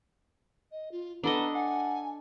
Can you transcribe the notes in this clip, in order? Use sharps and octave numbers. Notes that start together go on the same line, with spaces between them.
D#5
F4
B3 D4 A4 D#5 A#5
F#5 G#5